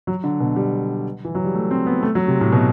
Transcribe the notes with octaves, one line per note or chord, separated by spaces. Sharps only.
F#3
D3
B2
G3
E3
F#3
G3
A3
C4
B3
A3
F#3
C3
A2
B2